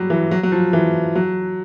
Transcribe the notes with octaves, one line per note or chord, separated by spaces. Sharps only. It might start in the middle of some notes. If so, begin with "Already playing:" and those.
Already playing: F#3 G3
E3
F#3
F#3
F3
E3
F#3